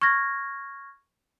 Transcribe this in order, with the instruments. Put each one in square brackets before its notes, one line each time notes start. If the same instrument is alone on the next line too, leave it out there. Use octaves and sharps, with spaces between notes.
[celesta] C#6 F6 G#6 A#6